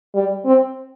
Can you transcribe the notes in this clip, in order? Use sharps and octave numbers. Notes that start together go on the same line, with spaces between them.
G3
C4